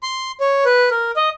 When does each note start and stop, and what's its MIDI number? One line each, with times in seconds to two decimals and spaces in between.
0.03 0.32 84
0.40 0.64 73
0.65 0.89 71
0.91 1.11 70
1.16 1.29 75